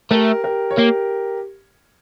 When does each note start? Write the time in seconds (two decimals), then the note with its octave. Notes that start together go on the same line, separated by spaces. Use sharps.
0.10 A3 G4 A#4
0.44 G4 A#4
0.71 C#5
0.77 A#3 G4 A#4